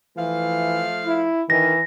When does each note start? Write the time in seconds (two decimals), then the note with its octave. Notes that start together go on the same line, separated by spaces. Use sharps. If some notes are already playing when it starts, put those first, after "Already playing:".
0.17 E3 F3 A3 F5
1.06 E4
1.50 D#3 E3 A#6